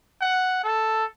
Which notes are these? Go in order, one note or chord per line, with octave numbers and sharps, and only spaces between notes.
F#5
A4